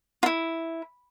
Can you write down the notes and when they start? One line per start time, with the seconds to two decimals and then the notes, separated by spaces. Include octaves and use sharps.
0.23 E4 F4